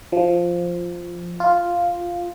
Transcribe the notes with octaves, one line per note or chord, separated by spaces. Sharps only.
F3
F4